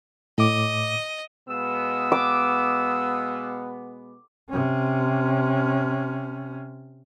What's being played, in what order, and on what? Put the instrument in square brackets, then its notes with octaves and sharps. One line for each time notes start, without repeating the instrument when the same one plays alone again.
[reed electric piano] A2 D6 [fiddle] D#5
[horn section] B2 G#3 B3 [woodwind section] F5 D#6 E6
[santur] D6
[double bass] C3 C#4